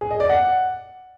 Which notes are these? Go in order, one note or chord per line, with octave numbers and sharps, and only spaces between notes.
G#4
D#5
D5
F#5